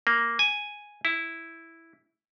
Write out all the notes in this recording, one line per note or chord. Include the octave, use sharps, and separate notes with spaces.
A#3
G#5
E4